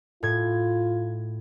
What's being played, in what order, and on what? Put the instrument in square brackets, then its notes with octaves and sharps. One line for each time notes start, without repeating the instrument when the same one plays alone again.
[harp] A2 G#6 [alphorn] F4